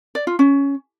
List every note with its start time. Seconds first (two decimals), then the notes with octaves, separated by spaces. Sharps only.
0.15 D5
0.27 F4
0.39 C#4